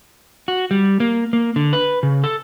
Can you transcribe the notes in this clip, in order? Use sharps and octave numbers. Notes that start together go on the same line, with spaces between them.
F#4
G3
A#3
A#3
D3
B4
C#3
A4